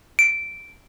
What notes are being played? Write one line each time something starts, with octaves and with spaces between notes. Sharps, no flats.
D7